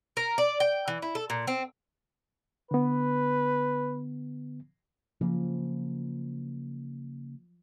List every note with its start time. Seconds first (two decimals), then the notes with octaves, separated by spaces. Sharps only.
0.17 A#4
0.38 D5
0.60 G5
0.88 E3
1.02 E4
1.15 A4
1.30 A#2
1.47 C4
2.71 D3 B3 B4
5.21 C#3 F3 F#3 A#3